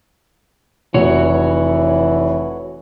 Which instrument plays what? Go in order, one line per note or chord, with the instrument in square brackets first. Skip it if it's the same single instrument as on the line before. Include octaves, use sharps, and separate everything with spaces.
[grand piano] F1 [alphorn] E3 [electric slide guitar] F#4 C#5